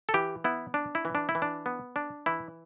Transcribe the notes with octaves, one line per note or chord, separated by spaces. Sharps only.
A4
E3 G4
B3 E4
D4
E4
E3
D4
E4
E3
D4
B3
D4
E3 E4